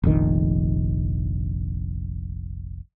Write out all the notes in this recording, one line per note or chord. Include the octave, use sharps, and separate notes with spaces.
F1 A#1 D#3